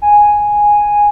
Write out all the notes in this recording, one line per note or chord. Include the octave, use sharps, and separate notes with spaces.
G#5